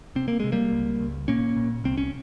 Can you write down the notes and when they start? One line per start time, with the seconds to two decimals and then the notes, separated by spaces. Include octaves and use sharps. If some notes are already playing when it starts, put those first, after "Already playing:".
0.15 C3 C4
0.28 A#3
0.40 C3 G#3
0.52 G3 A#3
0.72 C#2
1.00 C#2
1.28 A#2 A#3 C#4
1.56 A#2
1.84 C2 C4
1.98 C#4